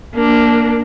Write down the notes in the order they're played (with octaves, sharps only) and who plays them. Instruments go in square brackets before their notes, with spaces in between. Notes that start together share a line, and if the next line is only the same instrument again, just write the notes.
[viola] A#3 D4